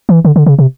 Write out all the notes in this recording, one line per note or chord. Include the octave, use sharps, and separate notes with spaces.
E3
D3
D3
C#3
C3